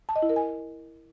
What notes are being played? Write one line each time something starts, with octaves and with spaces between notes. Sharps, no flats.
A5
D#5
E4
A#4
G#5